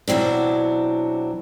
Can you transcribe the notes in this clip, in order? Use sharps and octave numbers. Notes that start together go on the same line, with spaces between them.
B2 E3 F#3 C4 D4